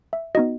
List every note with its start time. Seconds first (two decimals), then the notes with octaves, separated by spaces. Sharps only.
0.13 E5
0.35 B3 D#4 F#4 D#5